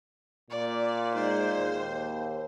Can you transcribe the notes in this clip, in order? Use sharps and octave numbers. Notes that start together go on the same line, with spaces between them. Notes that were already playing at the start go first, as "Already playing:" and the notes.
A#2 D5
G#3 D#4 C5
D#2